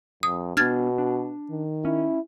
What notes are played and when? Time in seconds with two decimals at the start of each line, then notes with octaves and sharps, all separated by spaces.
0.23 F2 D#6
0.57 B2 B3 D4 F#4 F6 G#6 A6
0.98 D4
1.49 D#3
1.85 C#4 E4